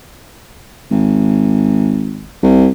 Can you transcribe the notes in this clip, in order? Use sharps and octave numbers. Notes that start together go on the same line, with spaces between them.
G#1
C2